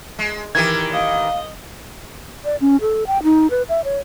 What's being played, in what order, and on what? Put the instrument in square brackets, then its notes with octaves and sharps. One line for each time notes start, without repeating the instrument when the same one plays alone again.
[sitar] G#3
[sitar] D#3 E3 G4 [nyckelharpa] A#4 [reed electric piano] G#6
[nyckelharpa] D#5 [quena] F5
[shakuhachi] D5
C#4
A4
G5
D#4
B4
E5
C#5